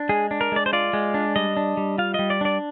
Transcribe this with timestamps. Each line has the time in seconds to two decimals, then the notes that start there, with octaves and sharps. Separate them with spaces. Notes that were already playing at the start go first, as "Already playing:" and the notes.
Already playing: D4
0.09 G#3 G#4
0.31 D4
0.41 A#4
0.52 G#3 D5
0.66 C5
0.73 F4 D5
0.93 G#3
1.14 D4
1.36 G3 D#5
1.57 D4
1.77 G3
1.98 F4 F5
2.14 G3 D#5
2.30 D5
2.41 D4 D5